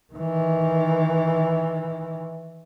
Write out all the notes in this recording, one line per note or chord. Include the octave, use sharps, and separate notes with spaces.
D#3 E3